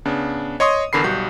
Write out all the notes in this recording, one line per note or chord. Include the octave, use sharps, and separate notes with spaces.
C#3 B3 D4
C#5 D#5 C6 C#6 D#6
G#1 E2 D3 A#4 B5 C7
B1 G3 F#4 G6